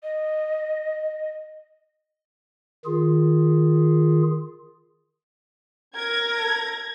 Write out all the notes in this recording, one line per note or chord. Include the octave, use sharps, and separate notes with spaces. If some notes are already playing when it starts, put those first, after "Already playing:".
D#5
D#3 F4 G#4
A#4 G#6 A#6